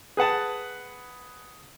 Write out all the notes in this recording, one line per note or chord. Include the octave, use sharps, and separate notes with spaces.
G#4 B4 F#5 A5